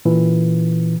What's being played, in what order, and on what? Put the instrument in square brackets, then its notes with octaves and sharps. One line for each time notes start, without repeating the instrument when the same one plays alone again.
[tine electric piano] A#2 E3